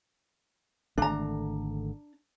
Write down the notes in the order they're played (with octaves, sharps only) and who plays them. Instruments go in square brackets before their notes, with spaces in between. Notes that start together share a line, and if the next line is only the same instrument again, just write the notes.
[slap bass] G#1 D3 A3 [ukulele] D4 A#5